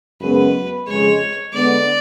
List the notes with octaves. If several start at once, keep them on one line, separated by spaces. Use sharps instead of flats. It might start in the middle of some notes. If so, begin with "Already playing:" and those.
F#2 C#3 G#3 B3 B4
F2 C#3 G#3 C#5
D3 G#3 B3 D5